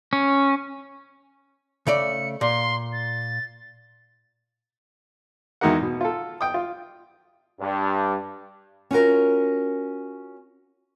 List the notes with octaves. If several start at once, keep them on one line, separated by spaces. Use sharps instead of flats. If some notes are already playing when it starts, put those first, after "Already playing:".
C#4
C#3 A3 D5 C#7
A#2 C6
A6
E2 G#3 D#4 F#4 A#4 F#5
B2
F4 A4
G5 D#6
F4
G2
C#4 F4 F#4 A#4